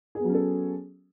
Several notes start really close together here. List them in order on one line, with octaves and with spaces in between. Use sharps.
G#4 B3 F#3 C#4 A4